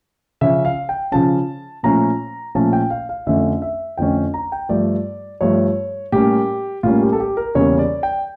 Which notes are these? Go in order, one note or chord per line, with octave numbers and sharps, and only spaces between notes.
C#3 F3 C#4 E5
F5
G5
C#3 F3 C#4 A5
A#2 F3 A3 C#4 A#5
A#2 F3 A3 C#4 A5
G5
F5
F5
F2 D3 A3 C#4 E5
E5
F2 D3 A3 C#4 G5
A#5
G5
G2 F3 A3 D5
G2 F3 A3 C#5
A2 G3 A#3 C#4 G4
A2 G3 A#3 C#4 F4
G4
A4
G4
A#4
E2 C#3 G3 A#3 C#4 C#5
D5
G5